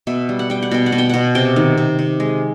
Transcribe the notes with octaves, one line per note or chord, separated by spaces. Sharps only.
B2 E5
G3
F#5
G3 G5
F#5
B2 G5
F#5
B2
G5
B2 F#5
C3 G5
D#3
C3
C3
G#3